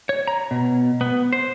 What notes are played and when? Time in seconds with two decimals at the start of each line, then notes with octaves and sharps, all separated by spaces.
0.09 C#5
0.27 A#5
0.51 B2
1.01 B3
1.33 C5